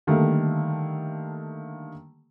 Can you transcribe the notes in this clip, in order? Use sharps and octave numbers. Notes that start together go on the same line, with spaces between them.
D3 D#3 G3 A3 A#3